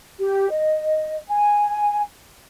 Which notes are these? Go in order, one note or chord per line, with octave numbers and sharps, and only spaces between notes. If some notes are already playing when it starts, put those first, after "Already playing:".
G4
D#5
G#5